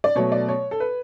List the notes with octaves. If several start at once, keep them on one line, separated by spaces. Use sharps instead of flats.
D5
B2 F#3 A3 C#5
D5
C#5
A4
B4